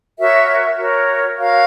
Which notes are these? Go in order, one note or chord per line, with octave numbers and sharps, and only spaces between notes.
F#4 A#4 C#5 E5
F#4 A#4 C#5
F#4 A#4 C#5 F5